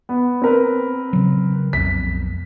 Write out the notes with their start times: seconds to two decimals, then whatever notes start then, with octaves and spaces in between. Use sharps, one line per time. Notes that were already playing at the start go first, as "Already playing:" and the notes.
0.09 B3
0.42 C4 A#4 B4
1.13 C#3 F#3
1.73 B1 F2 B6